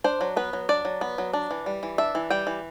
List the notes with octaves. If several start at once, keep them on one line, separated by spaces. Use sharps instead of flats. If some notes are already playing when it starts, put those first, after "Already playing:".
D4 C5
F#3
B3 B4
F#3
D4 D5
F#3
B3
F#3
D4
E3
G3
E3
D4 E5
E3
G3 G5
E3